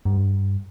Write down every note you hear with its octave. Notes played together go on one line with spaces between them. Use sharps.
G2